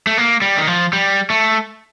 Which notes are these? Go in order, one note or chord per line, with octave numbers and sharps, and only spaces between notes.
A3
A#3
G3
D#3
F3
G3
A3